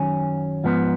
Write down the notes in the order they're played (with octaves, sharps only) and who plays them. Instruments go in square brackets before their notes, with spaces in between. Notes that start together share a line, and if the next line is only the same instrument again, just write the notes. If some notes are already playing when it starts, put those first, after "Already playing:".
Already playing: [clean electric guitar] F#2 D#3 F#3 C#4
G#2 F3 B3